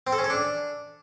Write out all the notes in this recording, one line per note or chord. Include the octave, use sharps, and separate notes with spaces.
C4
A4
C#4
A4
D4